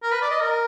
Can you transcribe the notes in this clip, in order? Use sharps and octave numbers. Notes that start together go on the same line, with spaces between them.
A#4
B4
D5
D#5
A#4